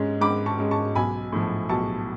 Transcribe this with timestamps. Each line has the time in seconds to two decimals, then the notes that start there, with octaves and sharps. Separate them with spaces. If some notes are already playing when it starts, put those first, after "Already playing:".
Already playing: G#2 G#3 C#4
0.21 G#2 B5 D6
0.46 A5 C#6
0.58 G#3 C#4
0.71 A5 C#6
0.95 B1 G#5 B5
1.32 A2 F3
1.69 B1 A5 C#6